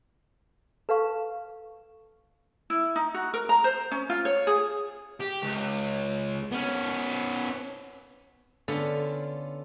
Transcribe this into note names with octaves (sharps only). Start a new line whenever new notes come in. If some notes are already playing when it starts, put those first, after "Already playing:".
A4 B4 F5 C#6
E4
D#4
F#4
A#4
A#5
C5
C#4
F4
C#5
G#4
G4
C#2
B3 C#4
D3 B3 C#4 F4 A4